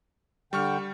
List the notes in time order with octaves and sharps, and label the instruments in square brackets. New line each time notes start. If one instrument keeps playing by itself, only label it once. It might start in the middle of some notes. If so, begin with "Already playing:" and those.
[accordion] D3 G5 [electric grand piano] G3 C#6 F6